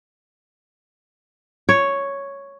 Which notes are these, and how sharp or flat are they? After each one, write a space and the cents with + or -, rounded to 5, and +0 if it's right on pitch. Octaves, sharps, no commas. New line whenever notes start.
C#5 +0